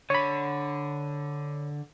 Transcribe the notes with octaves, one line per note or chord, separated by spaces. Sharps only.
D3 C#5 B5